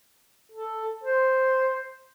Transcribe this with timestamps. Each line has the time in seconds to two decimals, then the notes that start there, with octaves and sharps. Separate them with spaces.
0.52 A4
1.04 C5